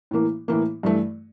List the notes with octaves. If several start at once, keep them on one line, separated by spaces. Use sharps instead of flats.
A2 E3 A#3
A2 E3 A#3
G2 E3 A3